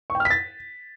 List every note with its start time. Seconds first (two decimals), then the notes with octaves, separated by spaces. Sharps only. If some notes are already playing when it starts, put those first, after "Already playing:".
0.10 C#6
0.15 G5
0.20 F6
0.25 B6
0.30 A6